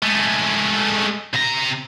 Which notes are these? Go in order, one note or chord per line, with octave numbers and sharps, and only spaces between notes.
G#3 A3
C3 A#5